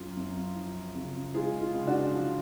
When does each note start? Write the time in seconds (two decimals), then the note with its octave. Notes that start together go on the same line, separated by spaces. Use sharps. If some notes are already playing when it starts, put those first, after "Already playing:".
Already playing: F#2 F4
0.17 F#2
0.56 F3
0.95 C#3
1.34 G#3 F4 G#4
1.61 F4
1.74 C#2
1.87 D4 F#4
2.14 F3